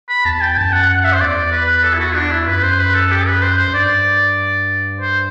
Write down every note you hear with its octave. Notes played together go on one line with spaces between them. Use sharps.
B5
E2 A5
G5
G5
F#2 A5
F#5
F#5
F#5
E5
C5
E2 D5
B4
A4
E4
F#4
D4
E4
F#2 B4
C5
B4
A4
G4
B4
C5
C5
F#2
G2 D5
C5